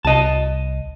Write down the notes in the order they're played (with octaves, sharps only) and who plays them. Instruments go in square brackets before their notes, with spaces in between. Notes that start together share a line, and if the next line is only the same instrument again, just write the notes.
[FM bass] C2 [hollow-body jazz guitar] D#5 A5